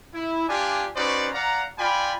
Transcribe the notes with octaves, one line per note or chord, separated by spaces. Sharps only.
E4
D4 F4 G4 D5 G#5
C#4 D#4 F#4 B4 C5 D5
D5 F5 F#5 A#5
F4 D5 G5 G#5 B5